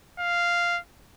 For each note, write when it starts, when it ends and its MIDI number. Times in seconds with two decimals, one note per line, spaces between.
0.19 0.79 77